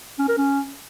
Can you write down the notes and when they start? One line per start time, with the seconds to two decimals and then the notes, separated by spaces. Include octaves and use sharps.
0.19 C#4
0.28 A#4
0.38 C#4